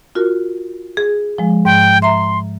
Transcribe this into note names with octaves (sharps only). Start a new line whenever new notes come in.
F4 F#4 A#4
G#4
F3 G#3
G#2 G5
E5 A#5 C6